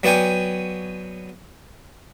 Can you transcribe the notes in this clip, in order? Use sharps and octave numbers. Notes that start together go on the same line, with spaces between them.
F#3 B3 D5 G5 G#5